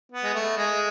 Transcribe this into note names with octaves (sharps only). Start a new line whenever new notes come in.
B3
G#3
A3
G#3